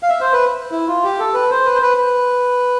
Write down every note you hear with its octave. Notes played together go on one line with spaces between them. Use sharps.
F5
E5
C5
B4
E4
F4
G4
A4
B4
C5
B4
C5
B4
B4